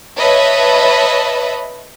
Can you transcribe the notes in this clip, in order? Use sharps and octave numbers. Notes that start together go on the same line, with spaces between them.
B4 C#5 D#5 E5 A5 B5